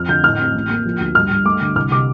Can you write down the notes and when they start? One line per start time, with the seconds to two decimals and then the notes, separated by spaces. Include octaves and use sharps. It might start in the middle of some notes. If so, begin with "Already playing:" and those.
Already playing: F2 F6
0.09 D3 G6
0.23 A2 F6
0.38 C4
0.54 A1
0.70 A#3
0.85 F3
1.00 D2
1.15 G2 F6
1.31 G2
1.45 A3 D6
1.62 D3
1.76 C2 F6
1.91 C3 D6